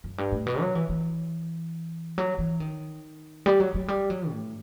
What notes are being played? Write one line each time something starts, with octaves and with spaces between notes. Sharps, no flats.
F#2
G2
A2
B2
F#3
E3
E3
F#3
E3
D#3
G3
F#3
F#3
G3
F#3
A2